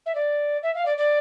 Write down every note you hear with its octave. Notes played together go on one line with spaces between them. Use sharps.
E5
D5
E5
F5
D5
D5